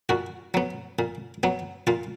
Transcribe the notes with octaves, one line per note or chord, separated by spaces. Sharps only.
A#2 F#4
F#3 B3
A#2
F#3 B3
A#2 F4